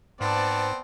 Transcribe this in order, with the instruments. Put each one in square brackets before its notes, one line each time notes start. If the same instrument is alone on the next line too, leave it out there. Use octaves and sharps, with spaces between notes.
[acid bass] G#2 [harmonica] B3 C4 [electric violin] D5 A5